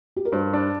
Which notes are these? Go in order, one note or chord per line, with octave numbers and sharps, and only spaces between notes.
G4
A#4
G2 C5
D4